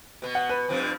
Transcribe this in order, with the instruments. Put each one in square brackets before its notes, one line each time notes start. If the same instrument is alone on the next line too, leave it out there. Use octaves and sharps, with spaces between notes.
[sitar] B2 B3
[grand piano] F#5
B4
[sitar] G2 F3 C4